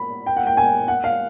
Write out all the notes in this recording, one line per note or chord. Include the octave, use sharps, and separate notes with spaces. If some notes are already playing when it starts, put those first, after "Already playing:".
Already playing: B5
G5
F#5
G5
G#5
F#5
F5